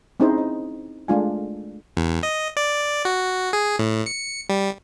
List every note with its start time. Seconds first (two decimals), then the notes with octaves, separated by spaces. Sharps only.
0.20 C4 C#4 D#4 E4 G#4 C5
0.38 D#5
1.08 G#3 A3 D4 F4 F5 G#5
1.97 E2
2.23 D#5
2.57 D5
3.05 F#4
3.53 G#4
3.79 A2
4.06 C#7
4.49 G3